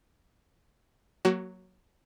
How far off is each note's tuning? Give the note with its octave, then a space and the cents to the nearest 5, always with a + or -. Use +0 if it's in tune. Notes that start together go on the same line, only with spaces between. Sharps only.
F#3 +0 A#3 +0 F#4 +25